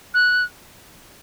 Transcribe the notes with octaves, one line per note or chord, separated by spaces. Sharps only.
F#6